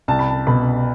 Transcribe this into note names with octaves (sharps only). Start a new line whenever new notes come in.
C2 A5
B5
A5
B2 B5